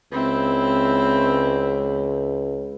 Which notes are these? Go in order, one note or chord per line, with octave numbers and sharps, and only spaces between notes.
C#2 C4 E4